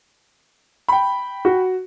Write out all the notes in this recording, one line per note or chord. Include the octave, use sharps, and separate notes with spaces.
G5 B5
F#4